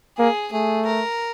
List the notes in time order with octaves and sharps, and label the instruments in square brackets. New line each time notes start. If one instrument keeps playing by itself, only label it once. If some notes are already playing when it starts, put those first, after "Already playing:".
[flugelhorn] A#3 [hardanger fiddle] G#4
[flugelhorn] A3 [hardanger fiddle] G#4
[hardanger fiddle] A#4